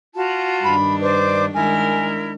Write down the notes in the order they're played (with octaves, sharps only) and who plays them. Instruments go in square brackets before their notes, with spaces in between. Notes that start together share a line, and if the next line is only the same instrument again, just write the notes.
[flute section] F4 F#4 A5
[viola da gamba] G2 D#3 D4 [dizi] B5
[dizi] B4 [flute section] C5 D5 D6
[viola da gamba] D#3 G#3 D4 [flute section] E4 A#4 [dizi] G#5